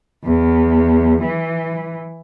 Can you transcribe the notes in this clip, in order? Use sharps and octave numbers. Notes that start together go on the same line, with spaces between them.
E2
E3